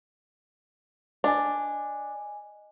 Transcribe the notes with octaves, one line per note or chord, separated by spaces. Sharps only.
D4 D#5 G#5